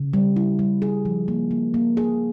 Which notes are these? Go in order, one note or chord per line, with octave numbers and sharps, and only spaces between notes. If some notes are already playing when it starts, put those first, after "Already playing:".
Already playing: C#3
G3
E4
G3
G#4
F3
A#3
A#3
A#3
G#4